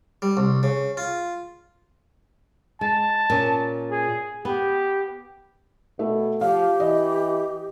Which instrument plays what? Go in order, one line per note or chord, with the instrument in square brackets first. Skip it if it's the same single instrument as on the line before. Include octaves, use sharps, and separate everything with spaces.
[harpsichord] G3
C2
C#3
F4
[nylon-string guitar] G#3 [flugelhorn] A5
[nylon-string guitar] A#2 C#4
[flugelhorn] G#4
[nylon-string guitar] B3 [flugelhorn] G4
[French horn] B2 [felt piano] A3
[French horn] F3 [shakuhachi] G4 [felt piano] F5
[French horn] E3 [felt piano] D#5